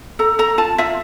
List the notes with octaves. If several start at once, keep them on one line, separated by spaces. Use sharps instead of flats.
A4 A#5
A4 A#5
F4 A5
F4 E5